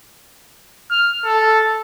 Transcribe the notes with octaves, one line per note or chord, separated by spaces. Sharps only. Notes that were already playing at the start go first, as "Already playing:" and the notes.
F6
A4